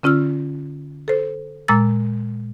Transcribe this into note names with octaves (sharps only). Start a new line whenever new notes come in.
D3 C#4 F4 E6 F6
A4 C5
A#2 G#3 A#5 E6 A6